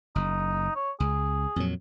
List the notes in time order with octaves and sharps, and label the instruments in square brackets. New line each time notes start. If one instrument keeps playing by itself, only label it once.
[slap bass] F#1 [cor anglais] D#4
[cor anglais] C#5
[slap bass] C#2 [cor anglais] G#4
[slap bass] F2 A#2 F#3